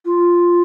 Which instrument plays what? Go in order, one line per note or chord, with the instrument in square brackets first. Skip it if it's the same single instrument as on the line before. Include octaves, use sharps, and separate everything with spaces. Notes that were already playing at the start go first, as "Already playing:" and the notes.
[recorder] F4